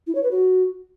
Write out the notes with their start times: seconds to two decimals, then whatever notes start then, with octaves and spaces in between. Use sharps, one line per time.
0.07 E4
0.15 C#5
0.23 B4
0.31 F#4